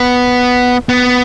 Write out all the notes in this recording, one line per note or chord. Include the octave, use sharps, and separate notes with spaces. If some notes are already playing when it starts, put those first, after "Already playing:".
Already playing: B3
B3